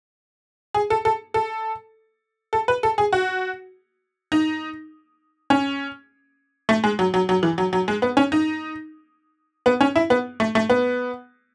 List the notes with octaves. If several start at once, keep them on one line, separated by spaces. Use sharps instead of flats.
G#4
A4
A4
A4
A4
B4
A4
G#4
F#4
D#4
C#4
A3
G#3
F#3
F#3
F#3
E3
F#3
F#3
G#3
B3
C#4
D#4
B3
C#4
E4
B3
A3
A3
B3